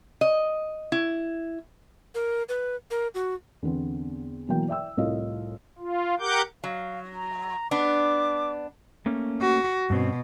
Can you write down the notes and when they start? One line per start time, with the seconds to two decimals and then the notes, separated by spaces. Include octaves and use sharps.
0.21 D#5
0.92 E4
2.15 A#4
2.49 B4
2.91 A#4
3.14 F#4
3.62 E2 D3 B3 C4
4.48 B2 E3 F#3 A#3 G5
4.68 D5 E5 G5 E6
4.97 C2 A2 C4 F4 D#5 F5
5.78 F4
6.19 G4 A#4 F#5 D6 G6
6.64 F#3 F5
7.14 A#5
7.71 B3 D4 D6
9.06 A3 A#3 C#4
9.42 F#4
9.90 G2 B2 C4 C#4